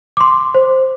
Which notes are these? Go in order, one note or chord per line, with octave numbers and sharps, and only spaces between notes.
C6 D6
C5